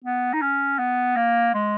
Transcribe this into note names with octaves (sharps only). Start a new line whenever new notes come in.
B3
D#4
C#4
B3
A#3
G#3